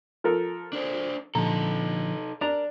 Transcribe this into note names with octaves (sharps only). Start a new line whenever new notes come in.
F3 A4 A#4
D4 C5
A#2 D3 F3 D#4 A4 A#5
D4 A#4 A#5